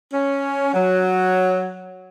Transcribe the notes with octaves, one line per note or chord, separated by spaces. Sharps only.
C#4
F#3